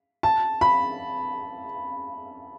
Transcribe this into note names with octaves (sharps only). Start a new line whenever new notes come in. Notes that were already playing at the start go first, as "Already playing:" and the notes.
A5
B5